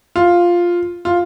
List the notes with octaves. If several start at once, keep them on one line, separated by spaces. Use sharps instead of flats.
F4
F4